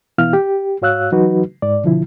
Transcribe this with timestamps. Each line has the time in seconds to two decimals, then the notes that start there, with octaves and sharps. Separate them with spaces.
0.18 B2 E3 B3 E4 F5 F6
0.33 G4
0.82 G#2 F#4 C#5 F5 E6 F#6
1.12 E3 F#3 D#4 F#4 B4
1.62 G#2 D5
1.83 B2 D3 F3 E4